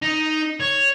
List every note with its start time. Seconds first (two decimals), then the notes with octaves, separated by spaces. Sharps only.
0.02 D#4
0.60 C#5